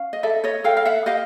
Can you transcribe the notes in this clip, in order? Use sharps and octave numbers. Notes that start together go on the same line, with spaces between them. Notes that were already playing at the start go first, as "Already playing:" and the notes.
Already playing: C#4 F5
D#5
A4 D5 E5
C#5 D#5
A4 F5 G5
F5
E5 F#5
G4 D#5 F5